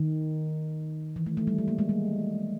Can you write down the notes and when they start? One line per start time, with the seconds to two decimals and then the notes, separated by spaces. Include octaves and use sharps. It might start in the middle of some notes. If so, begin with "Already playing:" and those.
Already playing: D#3
1.16 E3
1.26 A3
1.37 A3
1.47 G3
1.58 G#3
1.68 A#3
1.78 G#3
1.89 G3